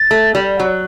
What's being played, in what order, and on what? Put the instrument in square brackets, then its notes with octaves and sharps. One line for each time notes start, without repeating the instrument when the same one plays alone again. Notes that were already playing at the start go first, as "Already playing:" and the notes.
Already playing: [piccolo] A6
[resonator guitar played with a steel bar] A3
G3
F#3